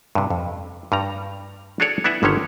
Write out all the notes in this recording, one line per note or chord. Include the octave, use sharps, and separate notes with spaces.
G2 C3
F2
G2 G3 A#5
D4 F#4 G#4 A4 C#5 D5
B3 D4 E4 E5 F#5 G#5
G1 D3 D#3 A3 C#4 C#5